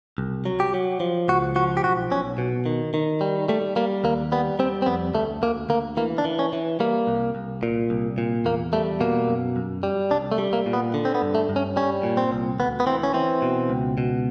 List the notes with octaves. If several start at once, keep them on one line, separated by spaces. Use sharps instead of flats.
C2
F#3
G4
F#3
F3
C#2 F#4
F3 F#4
G4
B1 F#4
B1 C#4
B2
D#3
D#3
G3
G3 A3
G3 A#3
D#2 A#3
G3 B3
G3 C4
C4
F2 B3
D2 A3
D2 A#3
D2 A#3
E3 A#3
D4
E3
C#4
E3
G3 A#3
C2
C2
A#2
C2
A#2
E2 A#3
G3 A3
B2 A#3
F#2
F#2
G3
C2 D4
A3
G3
A#3
A#2
B3
D3
C4
B3
G2
A3
G2
C#4
G3 C#4
A#2
C4
C2
D2 B3
B3
E3 C4
C#4
E3 C4
B2
C#2
B2